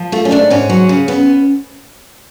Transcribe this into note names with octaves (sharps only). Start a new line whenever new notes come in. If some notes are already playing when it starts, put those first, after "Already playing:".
Already playing: F3
A3 F4
C#4
G#2 D4
G#2 C#4
F#3
C#3
B3